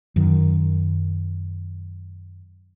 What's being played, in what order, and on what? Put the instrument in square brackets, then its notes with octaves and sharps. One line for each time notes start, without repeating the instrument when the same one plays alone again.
[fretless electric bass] F#2 D#3